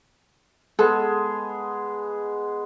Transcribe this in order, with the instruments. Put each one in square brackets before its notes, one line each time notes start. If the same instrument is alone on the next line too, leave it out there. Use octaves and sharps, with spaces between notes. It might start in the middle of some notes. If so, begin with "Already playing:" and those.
[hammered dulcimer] G#3 B3 [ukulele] A4